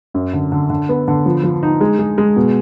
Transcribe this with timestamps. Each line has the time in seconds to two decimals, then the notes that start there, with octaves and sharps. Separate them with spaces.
0.14 F#2
0.33 D3
0.52 D3
0.70 D3
0.89 B3
1.08 D3
1.26 F3
1.43 F3
1.63 D#4
1.81 G#3
1.99 G#3
2.18 G#3
2.36 B2